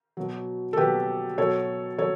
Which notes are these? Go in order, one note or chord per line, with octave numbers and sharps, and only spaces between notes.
B2 F#3
A4
B2 F#3 G4 B4
B2 F#3 A4 C#5
F#3 A4 C#5